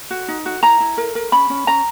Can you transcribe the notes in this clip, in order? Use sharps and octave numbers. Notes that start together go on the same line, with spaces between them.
F#4
D#4
F#4
E4 A#5
E4
A#4
A#4
C#4 B5
C#4
C#4 A#5